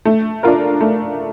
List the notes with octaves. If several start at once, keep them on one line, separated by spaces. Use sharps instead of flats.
A3
D4 F4 A#4
A3